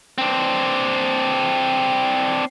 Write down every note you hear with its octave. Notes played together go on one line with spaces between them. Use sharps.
C4 D4